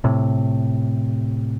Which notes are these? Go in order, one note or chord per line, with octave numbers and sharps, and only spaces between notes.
A2 C3